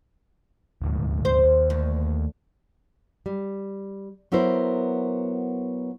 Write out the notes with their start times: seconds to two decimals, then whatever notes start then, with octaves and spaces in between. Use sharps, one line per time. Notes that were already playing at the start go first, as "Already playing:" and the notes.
0.82 D#1 D2 G#2
1.25 C5
1.44 D#2
1.70 D2
3.26 G3
4.32 F#3 B3 E4 A#4 C5